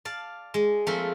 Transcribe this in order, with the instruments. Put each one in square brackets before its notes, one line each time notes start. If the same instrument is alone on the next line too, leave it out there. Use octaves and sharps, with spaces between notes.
[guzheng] D5 F5 A5
G#3
F3 A3 A#3 C4 F4